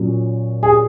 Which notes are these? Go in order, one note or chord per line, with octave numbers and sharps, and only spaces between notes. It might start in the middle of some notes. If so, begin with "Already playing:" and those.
Already playing: A#2 F#3 C#4
G#4